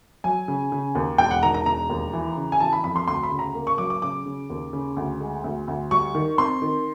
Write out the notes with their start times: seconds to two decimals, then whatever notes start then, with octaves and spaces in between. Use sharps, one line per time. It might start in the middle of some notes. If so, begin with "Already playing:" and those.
0.24 F#3 G#5
0.48 C#3
0.72 C#3
0.95 D#2
1.18 E1 G5
1.31 F#5
1.42 D#3 A#5
1.54 A#5
1.66 E1 A#5
1.90 D#2
2.13 E3
2.37 C#3
2.52 G#5
2.60 E3 A5
2.73 B5
2.84 F2 B5
2.96 C6
3.07 D2 C6
3.23 B5
3.31 C#3
3.39 A#5
3.55 A#3
3.67 C#6
3.78 F#3 D6
3.90 D6
4.02 C#3 D6
4.26 C#3
4.50 D#2
4.73 C#3
4.96 D2
5.20 G#3
5.44 D2
5.68 D2
5.91 G3 C#6
6.15 D#3
6.38 C4 C6
6.62 D#3